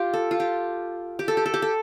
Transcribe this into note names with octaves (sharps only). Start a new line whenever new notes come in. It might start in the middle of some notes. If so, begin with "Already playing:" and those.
Already playing: F4 G4
A4
F4
G4
G4
A4
G4
A4
G4
A4